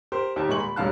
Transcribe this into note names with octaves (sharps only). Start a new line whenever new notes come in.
G4 A#4 C5
D#2 G4 A5
D#1 A#2 G#3 C#6 F#7
B5
E1 A1 G2 F5 A5 F#6